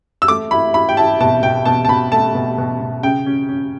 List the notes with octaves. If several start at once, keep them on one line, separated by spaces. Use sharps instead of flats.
E6
A3 D6
E4 B5
E4 B5
G5
E4 A5
B2 A5
B2 G5
B2 A5
A5
B2 B5
A3 A5
B2
B2
B2
C#3 G5
C#4
C#4